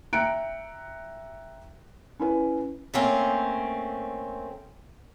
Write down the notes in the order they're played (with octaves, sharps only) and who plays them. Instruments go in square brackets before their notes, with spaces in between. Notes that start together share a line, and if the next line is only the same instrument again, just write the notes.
[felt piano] E5 G5 A#5 F#6 C#7 D7
C#4 E4 B4
[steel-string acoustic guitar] A3 A#3 C4 C#4